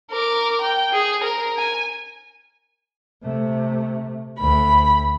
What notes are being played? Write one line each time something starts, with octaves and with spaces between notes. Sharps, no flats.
A#4 D6
G5
G#4
A#4
G#5
C3 A3
D2 B5